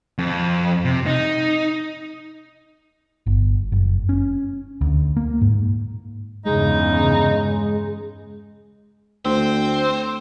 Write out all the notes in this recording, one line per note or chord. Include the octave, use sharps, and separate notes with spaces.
F2
C3
D#4
G1
F#1
C#4
D2
A#3
G#2
E2 G2 C#3 G#3 D#4
D2 C4 C5